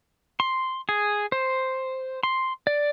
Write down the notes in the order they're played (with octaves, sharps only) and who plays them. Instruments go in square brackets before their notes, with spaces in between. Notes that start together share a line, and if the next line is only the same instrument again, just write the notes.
[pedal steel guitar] C6
G#4
C5
C6
D5